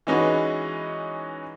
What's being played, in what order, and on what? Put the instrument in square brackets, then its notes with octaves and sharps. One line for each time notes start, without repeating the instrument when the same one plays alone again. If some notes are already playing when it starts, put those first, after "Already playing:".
[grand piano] E3 G#3 C#4 D#4 F#4 B4